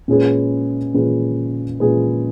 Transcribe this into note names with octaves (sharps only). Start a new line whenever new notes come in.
A#2 G#3 C#4 G#4 B4
A#2 G#3 C#4 G#4 B4
A#2 G#3 C#4 G#4 B4